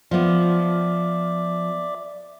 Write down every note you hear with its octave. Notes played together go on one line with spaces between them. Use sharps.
F3 B3 D5 E5 D6